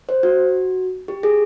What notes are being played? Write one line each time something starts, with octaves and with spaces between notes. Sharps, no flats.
C5
F#4
G4
G#4